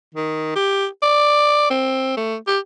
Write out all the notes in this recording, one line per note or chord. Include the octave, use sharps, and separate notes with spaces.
D#3
G4
D5
C4
A3
G4